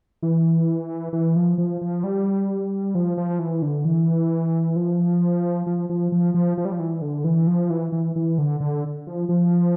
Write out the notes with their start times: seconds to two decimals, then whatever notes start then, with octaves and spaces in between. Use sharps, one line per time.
0.23 E3
1.13 E3
1.36 F3
1.58 F3
1.81 F3
2.04 G3
2.95 F3
3.17 F3
3.39 E3
3.62 D3
3.85 E3
4.76 F3
5.67 F3
5.90 F3
6.12 F3
6.34 F3
6.58 F3
6.65 G3
6.72 F3
6.79 E3
7.02 D3
7.24 E3
7.47 F3
7.70 E3
7.92 E3
8.16 E3
8.38 D3
8.60 D3
9.07 F3
9.29 F3